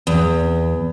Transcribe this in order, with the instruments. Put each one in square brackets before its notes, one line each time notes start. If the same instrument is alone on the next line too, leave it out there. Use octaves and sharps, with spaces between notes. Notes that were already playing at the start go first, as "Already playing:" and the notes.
[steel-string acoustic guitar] E2